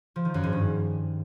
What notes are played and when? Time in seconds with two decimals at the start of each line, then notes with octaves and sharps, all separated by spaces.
0.16 F3
0.25 D#3
0.34 F#2
0.43 G#2
0.53 G2